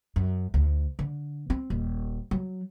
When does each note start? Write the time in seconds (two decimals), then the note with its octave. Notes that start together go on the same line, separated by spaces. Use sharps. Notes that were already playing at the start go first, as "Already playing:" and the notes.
0.16 F#2
0.54 D2
0.99 D3
1.50 C4
1.70 D#1
2.31 F#3